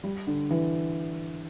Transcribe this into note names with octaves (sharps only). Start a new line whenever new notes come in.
G3
D3
E3